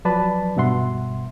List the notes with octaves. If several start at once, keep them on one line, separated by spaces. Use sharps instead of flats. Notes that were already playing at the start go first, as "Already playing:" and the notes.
F3 F#3 B4 D5 A5 B5
G2 B2 E5 F#5 C6